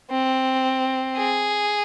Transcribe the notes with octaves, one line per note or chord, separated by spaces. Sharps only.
C4
G#4